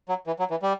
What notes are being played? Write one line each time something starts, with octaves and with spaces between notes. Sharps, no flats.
F#3
E3
F#3
E3
G3